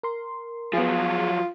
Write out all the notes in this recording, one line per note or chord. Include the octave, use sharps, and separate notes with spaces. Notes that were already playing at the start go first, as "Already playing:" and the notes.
A#4 C6
F3 F#3 B3 F4 G#4